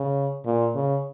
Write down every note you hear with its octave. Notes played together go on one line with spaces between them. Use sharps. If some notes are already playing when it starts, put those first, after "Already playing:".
Already playing: C#3
A#2
C#3